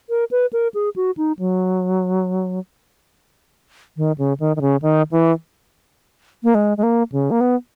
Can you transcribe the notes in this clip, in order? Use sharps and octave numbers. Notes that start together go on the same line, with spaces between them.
A#4
B4
A#4
G#4
F#4
D#4
F#3
D#3
C#3
D#3
D#3
C#3
D#3
E3
A#3
G#3
G#3
A#3
C#3
A#3
B3